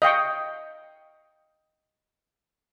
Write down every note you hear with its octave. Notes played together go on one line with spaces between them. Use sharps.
D#5 F5 G5 C#6